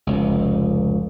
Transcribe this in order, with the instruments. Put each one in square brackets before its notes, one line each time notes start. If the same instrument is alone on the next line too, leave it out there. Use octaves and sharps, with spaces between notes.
[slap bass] F1 C#2